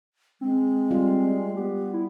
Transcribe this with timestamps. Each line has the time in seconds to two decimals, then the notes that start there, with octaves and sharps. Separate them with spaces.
0.41 G#3 C4
0.91 G3 F4
1.56 B3 G4
1.93 E4